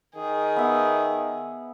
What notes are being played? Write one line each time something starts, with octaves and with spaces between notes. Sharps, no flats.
D#3 G#4
B3 E5